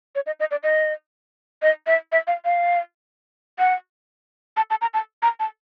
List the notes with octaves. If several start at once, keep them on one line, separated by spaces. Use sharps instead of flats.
C#5
D#5
D#5
D5
D#5
D#5
E5
E5
F5
F5
F#5
A5
A5
A#5
A5
A#5
A5